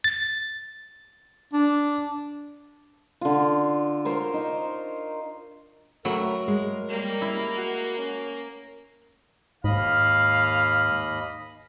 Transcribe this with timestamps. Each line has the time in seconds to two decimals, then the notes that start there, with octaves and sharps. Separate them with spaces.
0.04 A6
1.53 D4
3.21 D3 F4
4.05 A#4 C5 C#5
4.34 D#4
6.05 F#3 A3 A#4 B5
6.48 G#3
6.89 G3 A#3
7.21 E4
7.57 F#4
7.97 C#4
9.64 D#2 G#2 D#5 F5 B5